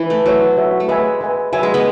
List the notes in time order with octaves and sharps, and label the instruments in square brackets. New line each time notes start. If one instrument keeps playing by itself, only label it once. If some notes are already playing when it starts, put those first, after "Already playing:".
Already playing: [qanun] E3
A3
[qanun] F#3 [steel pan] F#4 C#5 E5
[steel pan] F#4 C#5 E5
[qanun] A3
[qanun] G#3 [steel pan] B4 E5 G#5
[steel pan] B4 E5 G#5
[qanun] F#3 [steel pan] B4 E5 G#5
[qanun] G#3
G#3 B3